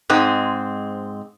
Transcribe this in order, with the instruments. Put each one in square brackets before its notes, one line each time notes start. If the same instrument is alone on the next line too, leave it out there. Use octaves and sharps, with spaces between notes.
[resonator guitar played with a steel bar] G#2 G#3 C4